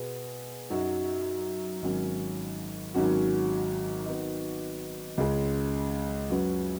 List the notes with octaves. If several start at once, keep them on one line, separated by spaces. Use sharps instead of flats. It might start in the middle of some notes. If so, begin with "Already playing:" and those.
Already playing: B2 B3 G#4
F#2 F#3 D#4 F#4
G#1 G#2 F#3 C#4
G#1 G#2 F#3 C#4 F#4
D#3 B3 F#4 D#5
C#2 C#3 G#3
F#2 F#3 C#4 F#4 B4